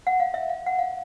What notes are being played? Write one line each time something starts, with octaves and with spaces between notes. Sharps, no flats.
F#5
F5
E5
F5
F#5
F5